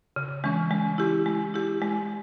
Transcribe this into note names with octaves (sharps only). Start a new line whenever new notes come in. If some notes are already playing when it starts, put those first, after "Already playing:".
C#3
E3 G#3 C#4
G#3
E4 G4
G#3
E4 G4
G#3